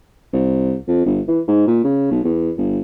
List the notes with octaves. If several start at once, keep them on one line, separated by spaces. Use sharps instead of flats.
C2
F2
G1
E3
G#2
A#2
C#3
B1
E2
G1